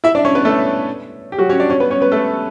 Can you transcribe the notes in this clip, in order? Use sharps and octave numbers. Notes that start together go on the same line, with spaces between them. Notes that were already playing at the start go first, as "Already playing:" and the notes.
E4 E5
D4 D5
C#4 C#5
B3 B4
A3 A4
G4
F#3 F#4
C#4 C#5
D4 D5
C#4 C#5
B3 B4
C#4 C#5
B3 B4
A3 A4